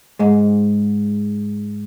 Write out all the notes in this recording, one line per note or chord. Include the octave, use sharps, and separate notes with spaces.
G#2 G#3